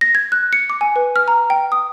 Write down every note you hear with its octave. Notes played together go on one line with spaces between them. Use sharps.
A#6
G#6
F#6
C#7
D6
G#5
B4
F6
A#5
G5
D#6